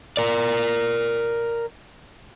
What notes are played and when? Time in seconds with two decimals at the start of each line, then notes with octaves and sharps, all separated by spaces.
0.17 A#4 D5